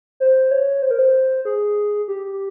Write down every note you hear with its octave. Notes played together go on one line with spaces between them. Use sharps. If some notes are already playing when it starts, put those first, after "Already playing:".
C5
C#5
C5
A#4
C5
G#4
G4